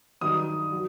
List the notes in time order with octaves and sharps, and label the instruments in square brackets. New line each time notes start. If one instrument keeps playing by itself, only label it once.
[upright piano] G2 D#3 F#3 D#6
F#3